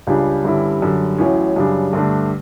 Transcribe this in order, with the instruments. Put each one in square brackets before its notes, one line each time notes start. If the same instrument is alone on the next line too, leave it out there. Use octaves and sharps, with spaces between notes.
[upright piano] C#2 C#3 G3 D4
G2 D3 G3 C#4 E4
F#2 D3 G3
A1 A2 F#3 C#4
F#2 C#3 G3 D4
G2 D3 A3 D4